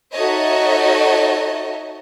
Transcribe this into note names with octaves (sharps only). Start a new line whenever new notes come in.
D#4 F#4 A4 C#5 D#5 E5